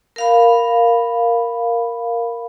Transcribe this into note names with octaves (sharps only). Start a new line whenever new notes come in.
A#4 F5 B5